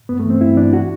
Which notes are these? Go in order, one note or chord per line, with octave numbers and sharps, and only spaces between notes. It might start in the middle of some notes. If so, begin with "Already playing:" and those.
G2 B3
A3
E3
C4
G2 E4
E3 D4
F#4